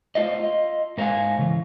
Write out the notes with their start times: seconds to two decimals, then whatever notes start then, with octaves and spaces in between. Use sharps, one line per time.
0.15 A3 F4 C5 D#5
0.40 F4 D#5
0.98 G#2 A#4 C5 F5 F#5 G#5
1.39 C#3 E3